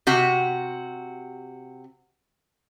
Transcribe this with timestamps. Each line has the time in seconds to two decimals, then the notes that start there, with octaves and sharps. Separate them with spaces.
0.07 C3 F#4